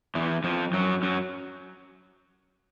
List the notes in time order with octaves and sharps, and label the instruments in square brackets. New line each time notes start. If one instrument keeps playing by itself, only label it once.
[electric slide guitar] E2 E3
F2 F3
F#2 F#3
F#2 F#3